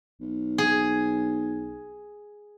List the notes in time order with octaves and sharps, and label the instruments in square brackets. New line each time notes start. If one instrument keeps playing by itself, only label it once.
[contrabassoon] B1
[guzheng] G#4